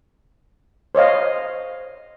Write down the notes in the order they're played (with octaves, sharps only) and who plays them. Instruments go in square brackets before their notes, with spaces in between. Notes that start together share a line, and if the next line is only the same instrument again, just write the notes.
[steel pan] C5 C#5 D#5 F5